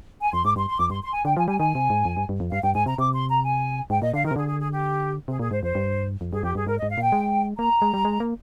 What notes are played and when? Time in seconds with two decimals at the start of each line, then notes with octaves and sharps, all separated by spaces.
0.21 G#5
0.32 F2 C6
0.44 G#2 D6
0.56 G2 C6
0.68 C6
0.78 F2 D6
0.90 G2 C6
1.03 C6
1.13 G#5
1.25 D3 G5
1.37 F3 G#5
1.48 G3 G#5
1.59 D#3 G#5
1.75 C3
1.90 G#2
2.05 F2
2.17 G2
2.29 G2
2.40 F2
2.51 G2 F5
2.63 G2 G5
2.75 G#2 G#5
2.86 C3 A#5
2.98 C3 D6
3.14 C6
3.29 A#5
3.44 G#5
3.90 G#2 G5
4.02 A#2 D#5
4.14 D3 F5
4.25 D#3 A#4
4.31 C3
4.36 D3 G#4
4.47 G#4
4.60 G#4
4.71 G4
5.28 C3 G#4
5.39 A#2 G#4
5.51 G#2 C5
5.63 F2 C5
5.75 G2
6.21 F2
6.32 G2 G#4
6.43 F2 G4
6.55 G2 G#4
6.67 G#2 A#4
6.78 D#5
6.82 G#2
6.90 F5
6.97 A#2 G5
7.12 G#3
7.58 A#3 A#5
7.82 G#3
7.94 G3
8.05 G#3
8.20 A#3